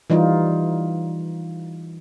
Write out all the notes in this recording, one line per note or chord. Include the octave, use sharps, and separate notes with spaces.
E3 G3 D#4 F4